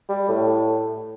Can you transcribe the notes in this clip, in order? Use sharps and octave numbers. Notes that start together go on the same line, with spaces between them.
G3
A2